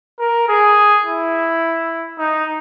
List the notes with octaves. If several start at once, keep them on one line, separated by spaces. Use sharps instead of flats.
A#4
G#4
E4
D#4